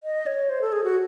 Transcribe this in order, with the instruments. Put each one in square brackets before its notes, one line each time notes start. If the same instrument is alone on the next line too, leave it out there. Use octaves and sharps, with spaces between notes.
[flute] D#5
C#5
C5
A4
G#4
F#4